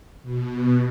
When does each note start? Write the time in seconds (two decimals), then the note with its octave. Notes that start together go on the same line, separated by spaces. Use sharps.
0.23 B2